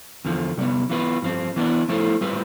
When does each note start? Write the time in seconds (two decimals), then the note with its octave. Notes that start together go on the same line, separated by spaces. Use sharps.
0.25 E2 D3 F3
0.57 C3 G3 B3
0.90 E3 B3 F4 B4
1.22 G2 F3 C4
1.56 E3 B3 D4
1.89 F3 A3 E4 A4 C5
2.21 A2 G3 C4 F4 B4